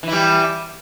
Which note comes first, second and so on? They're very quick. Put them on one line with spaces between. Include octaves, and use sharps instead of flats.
E3 E4 G3